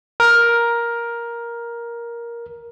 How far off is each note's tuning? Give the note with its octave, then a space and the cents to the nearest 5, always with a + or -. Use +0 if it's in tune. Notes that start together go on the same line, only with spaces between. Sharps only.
A#4 +10